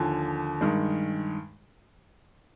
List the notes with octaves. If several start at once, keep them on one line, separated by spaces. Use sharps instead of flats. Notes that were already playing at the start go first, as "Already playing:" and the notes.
Already playing: D#2 D3 F3 G#5
G2 D#3 G#3